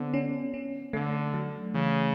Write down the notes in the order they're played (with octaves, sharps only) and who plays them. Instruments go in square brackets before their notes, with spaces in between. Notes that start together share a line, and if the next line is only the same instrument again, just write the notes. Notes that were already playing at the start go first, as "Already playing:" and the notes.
Already playing: [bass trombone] D3 [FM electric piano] B3 C4
[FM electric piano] C#4
C#4
[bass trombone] D3 [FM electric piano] A3
[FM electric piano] F#3
[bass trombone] C#3 [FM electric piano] E3